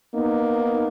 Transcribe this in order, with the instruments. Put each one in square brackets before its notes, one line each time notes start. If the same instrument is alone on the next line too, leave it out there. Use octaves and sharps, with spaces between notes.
[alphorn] A#3 [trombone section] B3 D#4